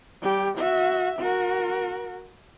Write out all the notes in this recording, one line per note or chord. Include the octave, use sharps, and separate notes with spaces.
G3 G4
F#4 E5
F#4 A#4